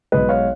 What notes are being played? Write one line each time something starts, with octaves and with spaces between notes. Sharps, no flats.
B1 B2 G#3 B4 D#5
C#5 F5